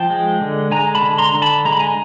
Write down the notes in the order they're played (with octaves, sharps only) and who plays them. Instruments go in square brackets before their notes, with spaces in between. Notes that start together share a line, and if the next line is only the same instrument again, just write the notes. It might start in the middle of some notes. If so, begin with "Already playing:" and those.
Already playing: [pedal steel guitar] F3 G5 A5
G#3
D3
G#3 G#5 A#5
A5 B5
D3
A#5 C6
D3
A5 B5
G#3 A#5
B5
G#5 A#5